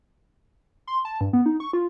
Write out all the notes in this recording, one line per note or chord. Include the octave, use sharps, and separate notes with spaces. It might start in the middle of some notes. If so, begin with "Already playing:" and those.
C6
A5
G2
B3
D#4
C#6
F4